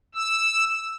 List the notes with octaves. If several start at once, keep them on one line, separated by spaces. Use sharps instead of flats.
E6